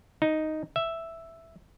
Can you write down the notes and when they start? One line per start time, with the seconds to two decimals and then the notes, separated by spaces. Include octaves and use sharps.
0.22 D#4
0.76 E5